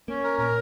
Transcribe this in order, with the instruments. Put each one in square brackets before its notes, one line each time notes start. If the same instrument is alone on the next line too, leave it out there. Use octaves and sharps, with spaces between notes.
[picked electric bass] A#3 [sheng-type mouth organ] C#4
[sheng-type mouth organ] A#4
[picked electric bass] A#2 [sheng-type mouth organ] A#4